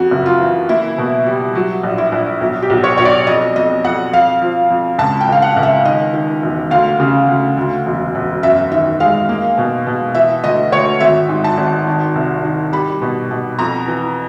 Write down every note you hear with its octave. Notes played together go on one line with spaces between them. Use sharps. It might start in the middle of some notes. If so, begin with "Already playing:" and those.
Already playing: F2 F#4
F#1
F4
E3
A#3 E4
B2
G3
F#3
A#1
E4
A#1
B1
G4
B1
C#5
B1 C#5
D5
F2 D#5
F2 D#5
F2 F#5
F2 F5
F3
F2
C#2 A5
G5
C#2 F5
F#5
C#2
E5
D#3 D#5
D#3
E1
D2 F5
C#3
D2
D2
E1
E1
F#2 E5
D#3 E5
G#3 F5
A#3
B2
B2
E3 E5
D2 D#5
D2 C#5
G#1 E5
G#2
A5
G#1
D#3
C2
D#3
G3 B5
B2
B2
F2 A#5
E3